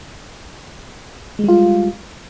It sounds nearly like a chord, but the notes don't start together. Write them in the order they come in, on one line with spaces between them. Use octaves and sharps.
G#3 G3 F4